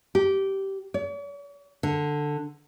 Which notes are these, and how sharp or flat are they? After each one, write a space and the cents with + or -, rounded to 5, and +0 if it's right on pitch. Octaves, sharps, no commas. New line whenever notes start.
G4 -15
C#5 +45
D3 +10